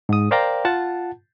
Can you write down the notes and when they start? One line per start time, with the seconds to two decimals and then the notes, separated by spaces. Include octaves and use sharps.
0.09 G#2 D#6
0.31 A#4 C5 D5 F5 G5 A#5
0.65 F4 F#5 A5